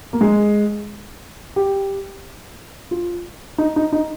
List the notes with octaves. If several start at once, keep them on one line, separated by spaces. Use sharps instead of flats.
A#3
G#3
G4
F4
D#4
D#4
D#4